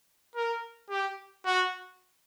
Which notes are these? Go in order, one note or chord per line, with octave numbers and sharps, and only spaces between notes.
A#4
G4
F#4